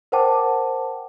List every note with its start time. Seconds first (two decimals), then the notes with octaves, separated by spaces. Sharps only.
0.12 A#4 C5 F#5 G5 A5 D6